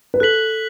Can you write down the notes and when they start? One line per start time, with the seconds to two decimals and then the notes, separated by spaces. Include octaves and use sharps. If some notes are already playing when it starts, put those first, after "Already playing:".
0.14 B4
0.20 A4 F#6 B6 F#7